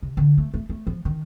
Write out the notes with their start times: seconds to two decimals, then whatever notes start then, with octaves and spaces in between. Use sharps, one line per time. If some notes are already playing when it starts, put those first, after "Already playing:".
0.02 C3
0.17 D3
0.38 A3
0.54 A3
0.69 A3
0.87 F3
1.05 D#3